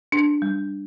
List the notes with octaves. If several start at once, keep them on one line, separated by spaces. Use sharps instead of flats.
D4
G3